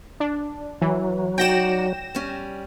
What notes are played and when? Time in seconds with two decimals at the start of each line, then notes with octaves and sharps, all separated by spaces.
0.20 D4
0.81 E3 F#3
1.38 D#4 F#4 D5 G5 A#6 E7
2.15 G3 C#4